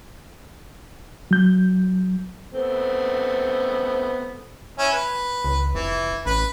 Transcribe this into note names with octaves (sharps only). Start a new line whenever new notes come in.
F#3 G6
A3 B3 C4
C#4 E4
B4
C#2
F1 E3
A1 B4 B5